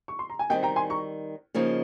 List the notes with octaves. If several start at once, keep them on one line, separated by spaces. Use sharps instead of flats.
C#6
C6
A#5
G#5
D#3 G3 C4 D#5 G5
G5 A#5
G#5 C6
A#5 C#6
C#3 F3 A#3 D#4